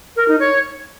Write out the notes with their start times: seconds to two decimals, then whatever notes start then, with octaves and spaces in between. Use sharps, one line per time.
0.16 A#4
0.28 D#4
0.40 C#5